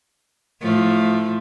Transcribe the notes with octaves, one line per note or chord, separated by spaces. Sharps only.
A2 F3 A3